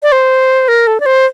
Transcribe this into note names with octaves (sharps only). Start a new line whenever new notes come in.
D5
C5
A#4
A4
D5
C5